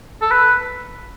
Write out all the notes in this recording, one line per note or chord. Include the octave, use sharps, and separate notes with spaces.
A4
B4